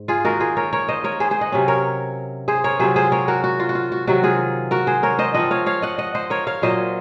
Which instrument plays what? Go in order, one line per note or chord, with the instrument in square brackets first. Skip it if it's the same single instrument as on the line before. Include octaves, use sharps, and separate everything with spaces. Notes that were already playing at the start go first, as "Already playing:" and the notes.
Already playing: [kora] G#2
F4 G#4
D#3 A#3 D#4 F#4 A#4
F4 G#4
A#4 C#5
A#4 C#5
C5 D#5
A#4 C#5
G#4 C5
G#4 C5
D#5 F#5
C3 F#3 C#4
A#4 C#5
G#4 C5
A#4 C#5
C3 F#3 C4 F4 G#4 C5
G#4 C5
A#4 C#5
F#4 A#4
F#4
F4
F#4
F4
F#4
C3 D#3 F#3 F#4
F4 G#4
F#4 A#4
G#4 C5
A#4 C#5
C5 D#5
F3 C4 F4 D#5 F#5
C#5 F5
C#5 F5
D#5 F#5
D#5 F#5
C5 D#5
A#4 C#5
C#5 F5
A#2 F#3 A#3 F4 C5 D#5